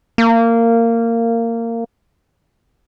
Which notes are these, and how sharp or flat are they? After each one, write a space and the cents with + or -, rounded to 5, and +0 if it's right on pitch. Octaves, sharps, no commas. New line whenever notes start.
A#3 -20